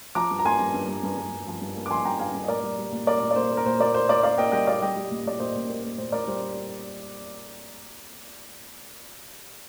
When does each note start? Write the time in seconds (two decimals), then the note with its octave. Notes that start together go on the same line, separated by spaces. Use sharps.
0.15 F3 A#5 D6
0.31 G2
0.39 A#5
0.45 A#3 G#5 C6
0.60 G2
0.74 G2
0.88 G2
1.03 G2
1.17 G2
1.33 G2
1.47 F3
1.62 G2
1.76 A#3
1.86 D6
1.90 F3 G#5 C6
2.05 G2 G5 A#5
2.19 G2 F5 G#5
2.35 G2
2.43 D#5
2.48 A#2 A#4 D5
2.63 G3
2.78 G3
2.92 A#2
3.07 A#3 A#4 D5
3.22 A#2
3.31 D5
3.36 A#3 C5
3.51 A#3
3.57 A#4
3.65 A#2 C5
3.80 A#3 A#4 D5
3.94 A#3 C5
4.08 A#3 A#4 D5
4.23 A#3 D5 F5
4.38 A#3 D#5 G5
4.52 G3 D#5 G5
4.67 A#2 D5 F5
4.82 G3 D#5 G5
4.96 G3
5.11 A#2
5.26 A#2 D5
5.40 A#2 C5 D#5
5.55 A#2
5.69 A#3
5.84 A#3
5.98 A#2 C5
6.12 A#2 A#4 D5
6.27 G3 C5